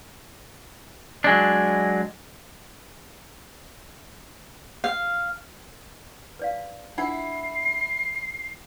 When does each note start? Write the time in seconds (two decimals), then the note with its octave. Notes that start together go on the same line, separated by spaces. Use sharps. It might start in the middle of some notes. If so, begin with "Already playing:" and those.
1.24 F#3 G#3 D4
4.84 F5
6.39 B4 D5 F5
6.98 D4 E4 F4 F#5 C7